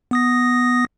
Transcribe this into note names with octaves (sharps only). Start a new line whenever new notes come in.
B3 D#6 A#6